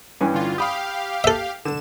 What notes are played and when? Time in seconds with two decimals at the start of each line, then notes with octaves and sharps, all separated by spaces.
0.21 G2 E3 C#4
0.34 D3 F4
0.58 G4 F5 B5 D#6
1.24 A4 E5
1.65 D3 E7